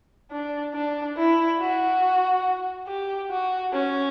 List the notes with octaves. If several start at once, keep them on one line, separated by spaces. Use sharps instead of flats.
D4
D4
E4
F#4
G4
F#4
C#4